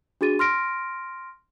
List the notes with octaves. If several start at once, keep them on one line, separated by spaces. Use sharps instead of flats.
D4 F#4 G#4 A6 D#7
C6 F6 A#6 D7